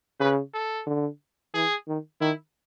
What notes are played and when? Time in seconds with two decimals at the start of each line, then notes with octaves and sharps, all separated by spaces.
0.20 C#3 B4
0.54 A4
0.87 D3
1.54 E3 G#4
1.88 D#3
2.21 D#3 E4